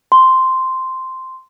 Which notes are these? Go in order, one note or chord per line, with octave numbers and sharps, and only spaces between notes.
C6